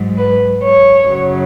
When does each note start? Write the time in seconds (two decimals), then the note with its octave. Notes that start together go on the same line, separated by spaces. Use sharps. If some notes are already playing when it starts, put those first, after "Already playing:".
Already playing: G#2 F#3
0.18 B4
0.62 C#5
1.06 F#2 C#3 F#3